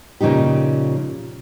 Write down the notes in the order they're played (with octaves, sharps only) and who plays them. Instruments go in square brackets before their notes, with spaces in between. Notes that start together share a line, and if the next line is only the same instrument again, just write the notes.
[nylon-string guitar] A#2 C#3 F3 D#4 G4